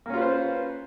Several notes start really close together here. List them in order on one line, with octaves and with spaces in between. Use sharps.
A#3 C#4 F4 B4 C5